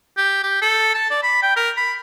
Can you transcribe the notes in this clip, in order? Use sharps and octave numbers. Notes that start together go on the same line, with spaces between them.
G4
G4
A4
A5
D5
B5
G5
A#4
B5